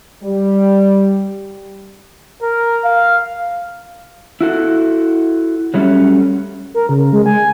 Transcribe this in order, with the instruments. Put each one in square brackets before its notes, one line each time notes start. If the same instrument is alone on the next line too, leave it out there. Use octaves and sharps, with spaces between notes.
[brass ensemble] G3
[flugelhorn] A#4
F5
[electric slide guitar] E4 F#4 A4
F#3 G3 A3 B3 C#4
[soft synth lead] A#4
C#3
G#3
G#5